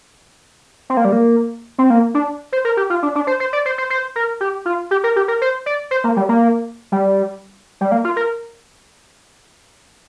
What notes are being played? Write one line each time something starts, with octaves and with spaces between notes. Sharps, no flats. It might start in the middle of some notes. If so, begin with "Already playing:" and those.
C4
A#3
G3
A#3
C4
A#3
D4
C5
A#4
G4
F4
D4
D4
C5
C5
D5
C5
C5
C5
A#4
G4
F4
G4
A#4
G4
A#4
C5
D5
C5
A#3
G3
A#3
G3
G3
A#3
F4
A#4